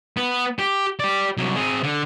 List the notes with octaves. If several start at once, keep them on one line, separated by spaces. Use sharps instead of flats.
B3
G4
G4 D5
C2 F#3
C4 G#4
D3